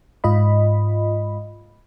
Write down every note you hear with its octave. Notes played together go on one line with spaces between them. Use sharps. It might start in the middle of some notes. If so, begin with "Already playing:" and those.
G#2 F4 D#5 B5